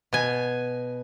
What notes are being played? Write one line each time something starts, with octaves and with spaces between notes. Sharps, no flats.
B2 G#5